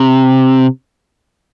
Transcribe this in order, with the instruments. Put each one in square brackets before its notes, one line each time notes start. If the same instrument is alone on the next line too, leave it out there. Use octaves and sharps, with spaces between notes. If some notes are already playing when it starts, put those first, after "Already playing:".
Already playing: [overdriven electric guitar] C3